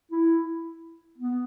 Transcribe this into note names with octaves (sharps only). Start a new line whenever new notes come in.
E4
B3